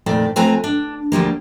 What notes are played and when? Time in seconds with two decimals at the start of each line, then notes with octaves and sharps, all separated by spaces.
0.06 F2 A#2 D#3 A3 D5
0.36 F3 A3 C4 B4 G#5 A#5
0.64 D4
1.12 D2 F3 G3 A#3